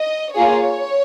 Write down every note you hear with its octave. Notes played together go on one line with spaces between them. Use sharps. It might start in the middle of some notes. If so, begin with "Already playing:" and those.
Already playing: D#5
A#3 F4 G#4 C#5